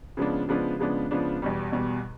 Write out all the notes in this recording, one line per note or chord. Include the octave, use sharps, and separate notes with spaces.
C#3 F3 G#3 B3 D4
C#3 F3 G#3 B3 D4
C#3 F3 G#3 B3 D4
C#3 F3 G#3 B3 D4
E2 B2 G3
E2 B2 G3